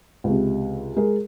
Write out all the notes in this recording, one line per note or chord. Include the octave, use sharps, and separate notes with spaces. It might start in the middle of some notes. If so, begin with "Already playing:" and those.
C#2 C3
G#3 G#4 A#4